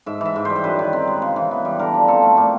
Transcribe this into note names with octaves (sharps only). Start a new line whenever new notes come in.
G#2 E5
E3 E5
G#2
G3 C5
C5
F#2 B4
D#3
C4
G#3
C#3
E3
B3
G3
D3 A#4
F3
C4 A4
A3
A#2 G4